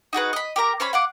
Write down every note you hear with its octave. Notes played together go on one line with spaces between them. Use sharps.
D#4 F#4 G#4 B4
D#5 B5
G4 A#4 A#5
C#4 C5 C#5 B5
F5 F#5 D6